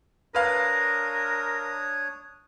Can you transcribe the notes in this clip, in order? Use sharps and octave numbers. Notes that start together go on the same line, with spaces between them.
D4 A#4 B4 C#5 F5 D#6